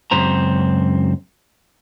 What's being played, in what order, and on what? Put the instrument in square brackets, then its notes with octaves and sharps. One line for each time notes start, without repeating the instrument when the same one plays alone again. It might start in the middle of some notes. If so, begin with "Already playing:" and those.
[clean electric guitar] C#2 F#2 C4 C5 A#5